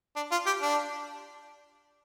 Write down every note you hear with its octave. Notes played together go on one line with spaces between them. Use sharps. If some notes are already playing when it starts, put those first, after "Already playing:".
D4
F4
G4
D4